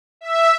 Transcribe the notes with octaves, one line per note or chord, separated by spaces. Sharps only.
E5